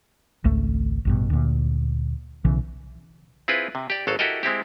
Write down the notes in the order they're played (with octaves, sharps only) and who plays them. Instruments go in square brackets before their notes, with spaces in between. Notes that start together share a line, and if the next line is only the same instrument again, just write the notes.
[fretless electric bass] G#1 C#2 A3
A1 G2 B2
D2 A#2
B1 C#3 E3
[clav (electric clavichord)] C4 E4 F4 G#4 B4
C3
G4 D5
G#1 F#3 A4 F5
E4 F#4 G4 A4 A#4 D#5
G#3 C4 E4 G4